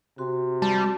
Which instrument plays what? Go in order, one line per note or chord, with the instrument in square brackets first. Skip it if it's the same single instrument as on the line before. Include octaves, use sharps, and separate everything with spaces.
[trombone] C3 [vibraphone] F#4 C6
[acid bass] G3 [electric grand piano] A5